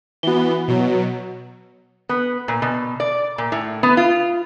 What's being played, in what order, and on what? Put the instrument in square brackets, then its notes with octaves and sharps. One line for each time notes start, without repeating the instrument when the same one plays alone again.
[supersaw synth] E3 B3 [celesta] F#4 G7
[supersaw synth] B2 F#3
[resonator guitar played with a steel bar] B3
A#2
B2
D5
A#2
A2
B3
F4